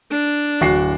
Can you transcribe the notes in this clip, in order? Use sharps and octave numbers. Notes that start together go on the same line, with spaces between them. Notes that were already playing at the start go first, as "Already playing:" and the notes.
D4
D1 F#4 C7